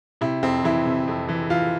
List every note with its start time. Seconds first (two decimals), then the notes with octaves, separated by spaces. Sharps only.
0.21 C3 E4
0.42 F2 C4
0.64 E3 E4
0.86 C3
1.07 F2
1.29 E3
1.50 E3 F4